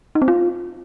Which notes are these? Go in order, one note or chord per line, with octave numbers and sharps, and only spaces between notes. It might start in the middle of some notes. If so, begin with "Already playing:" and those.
D#4
C4
F4